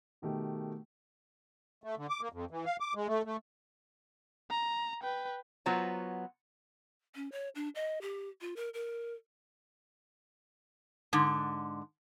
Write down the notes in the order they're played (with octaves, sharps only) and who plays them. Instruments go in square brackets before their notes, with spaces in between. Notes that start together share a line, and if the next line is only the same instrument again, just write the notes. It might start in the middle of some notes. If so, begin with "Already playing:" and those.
[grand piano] B2 D#3 A3 G4
[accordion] A3
D3
D6
A#3
F2
E3
F5
D6
G#3
A3
A3
[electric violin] A#5
B4 G5
[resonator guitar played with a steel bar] F#3 B3 F4 C5 C#5 A#5
[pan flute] C#4
C#5
D4
D#5
G4
F4
A#4
A#4
[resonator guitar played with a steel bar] G#2 D3